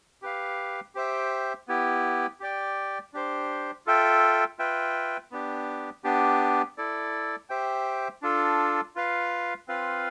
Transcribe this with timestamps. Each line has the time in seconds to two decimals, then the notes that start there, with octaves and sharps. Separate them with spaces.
0.22 G4 B4 F5
0.95 G4 C5 E5 G5
1.68 B3 E4 G4
2.40 G4 D5 G5
3.13 D4 G4 C5
3.86 F4 A4 E5 G5
4.59 F4 B4 E5 G5
5.32 B3 D4 G4
6.04 B3 D4 G4
6.78 E4 A4 D5
7.49 G4 C5 E5 G5
8.22 D4 F4 A4
8.96 F4 B4 F5
9.68 C4 F4 B4 F5